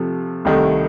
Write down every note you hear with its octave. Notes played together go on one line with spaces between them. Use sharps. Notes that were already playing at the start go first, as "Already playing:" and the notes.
Already playing: C3 F3 A3
C2 C3 D#3 A3